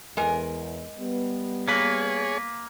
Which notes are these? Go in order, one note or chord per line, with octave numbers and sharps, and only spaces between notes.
E2 G#3 A#4 G#5
G3 B3
A#3 G#4 B4 C#5